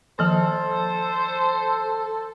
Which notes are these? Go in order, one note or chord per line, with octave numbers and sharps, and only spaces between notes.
D#3 F3 A#3 A4 C5